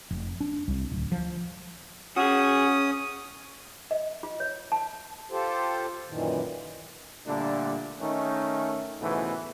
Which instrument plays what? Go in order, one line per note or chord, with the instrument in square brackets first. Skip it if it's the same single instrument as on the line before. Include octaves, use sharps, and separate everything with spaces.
[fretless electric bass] F1
D4
C2
D1
F3
[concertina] C#4 D#6 [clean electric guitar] F#4 G#4
[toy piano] D#5
F4
C#5
A5
[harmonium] F4 G4 A4 C5
F#2 A#2 D#3 E3
[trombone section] A#2 D3 G3 A3 A#3 D4
D#3 A3 C#4 D#4
C#2 G#2 B2 E3 A3 B3